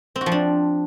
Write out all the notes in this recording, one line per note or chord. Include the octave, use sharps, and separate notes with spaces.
C4
F#4
F3
D4